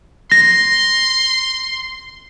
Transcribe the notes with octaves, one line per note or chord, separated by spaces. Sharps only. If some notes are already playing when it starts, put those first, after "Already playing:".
C6 A#6